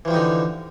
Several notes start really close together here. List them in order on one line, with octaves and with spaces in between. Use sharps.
E3 F3 G3 D#4 D3